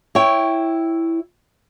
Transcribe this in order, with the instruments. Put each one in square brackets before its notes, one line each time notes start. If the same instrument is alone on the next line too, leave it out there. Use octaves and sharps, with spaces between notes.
[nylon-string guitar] E4 C#5 G5